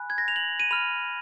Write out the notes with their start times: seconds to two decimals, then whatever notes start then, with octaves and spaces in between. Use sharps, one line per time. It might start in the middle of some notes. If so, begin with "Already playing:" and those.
Already playing: G#5 B5 F#6
0.10 G#6
0.18 A#6
0.28 F7
0.36 F#7
0.60 D#7
0.71 B5 F6 F7